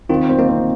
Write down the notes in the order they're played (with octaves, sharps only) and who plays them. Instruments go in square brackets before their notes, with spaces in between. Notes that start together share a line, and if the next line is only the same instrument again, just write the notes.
[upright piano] D#3 [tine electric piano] C4 F4
[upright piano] C4
[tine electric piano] A#3 D#4
[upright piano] C4